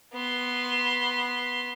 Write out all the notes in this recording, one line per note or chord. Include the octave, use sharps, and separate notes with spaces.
B3 C6